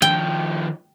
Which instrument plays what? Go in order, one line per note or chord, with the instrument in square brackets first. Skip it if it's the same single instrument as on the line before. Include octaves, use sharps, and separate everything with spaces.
[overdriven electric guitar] D#3 F3 [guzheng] G5